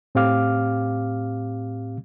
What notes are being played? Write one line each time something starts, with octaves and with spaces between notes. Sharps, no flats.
A2 C4 G4 F5 D6 F6